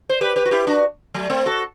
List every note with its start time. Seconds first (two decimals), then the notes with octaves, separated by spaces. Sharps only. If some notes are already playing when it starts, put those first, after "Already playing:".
0.09 C5
0.21 G4 B4
0.36 G4 B4
0.45 F#4
0.51 E4 G4
0.67 D4 F#4
1.14 F#3 A3
1.30 A3 C4
1.46 F#4 A4